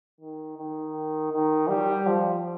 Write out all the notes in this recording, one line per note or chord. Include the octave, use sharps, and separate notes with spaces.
D#3
D#3
D#3
G3
F3